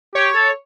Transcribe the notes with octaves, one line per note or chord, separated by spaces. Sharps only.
G4 C#5
A4